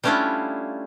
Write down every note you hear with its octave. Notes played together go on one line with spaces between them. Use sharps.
G3 A3 C#4 D4 E4 F4